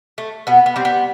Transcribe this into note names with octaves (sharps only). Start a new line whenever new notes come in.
A3
B2 B3
B3
G3 C4
B3